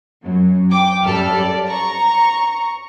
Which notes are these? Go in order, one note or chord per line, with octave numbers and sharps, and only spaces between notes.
F#2 F#3
G5 D6
F#2 G3 A4 E5 F6
D5
A#5 C#6